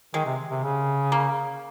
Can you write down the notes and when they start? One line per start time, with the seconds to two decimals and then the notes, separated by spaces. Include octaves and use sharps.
0.14 D#3 G#3
0.26 C3
0.51 C3
0.64 C#3
1.12 A#3